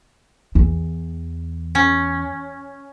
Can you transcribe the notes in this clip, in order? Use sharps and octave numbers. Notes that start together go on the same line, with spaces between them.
E2
C#4